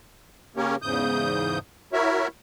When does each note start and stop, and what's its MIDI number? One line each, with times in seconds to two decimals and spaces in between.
0.56 0.76 49
0.56 0.76 58
0.56 0.76 61
0.56 0.76 67
0.56 0.76 70
0.56 0.76 73
0.82 1.58 40
0.82 1.58 44
0.82 1.58 49
0.82 1.58 87
0.82 1.58 91
1.93 2.27 64
1.93 2.27 66
1.93 2.27 70
1.93 2.27 73
1.93 2.27 76